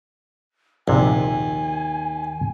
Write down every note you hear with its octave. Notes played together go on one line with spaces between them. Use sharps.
A#1 D#2 C3 G#5